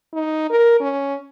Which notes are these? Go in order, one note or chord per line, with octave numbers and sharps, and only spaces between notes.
D#4
A#4
C#4